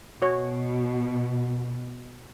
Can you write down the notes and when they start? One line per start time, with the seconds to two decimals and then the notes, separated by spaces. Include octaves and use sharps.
0.22 B2 F#4 C#5